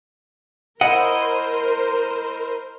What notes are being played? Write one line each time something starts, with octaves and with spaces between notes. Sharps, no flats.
E4 A#4 C5 D#5 F#5